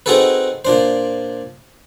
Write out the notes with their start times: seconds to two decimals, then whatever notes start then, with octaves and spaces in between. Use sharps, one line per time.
0.06 C4 D#4 F#4 G#4 A4 B4
0.65 A#2 D4 C5